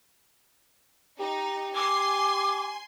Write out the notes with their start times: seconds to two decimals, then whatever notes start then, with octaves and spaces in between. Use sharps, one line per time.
1.19 D#4 G4
1.75 G#5 C6 D6